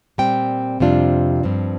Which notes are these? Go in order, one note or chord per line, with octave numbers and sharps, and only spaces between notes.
A#2 G3 C4 G5
F2 C3 G3 D4 F4
G2 F3 C4